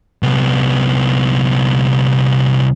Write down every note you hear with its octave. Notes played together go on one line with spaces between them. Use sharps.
C2 B3